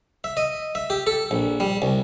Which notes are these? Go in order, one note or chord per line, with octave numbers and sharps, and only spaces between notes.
E5
D#5
E5
G4
A4
A#1
G3
C2